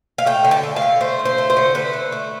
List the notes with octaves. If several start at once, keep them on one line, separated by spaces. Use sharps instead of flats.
F5
A3 G5
D3
A5
A3
F5
D3
A3 C5
D3
C5
A3
C5
D3
A3 B4
D3
A3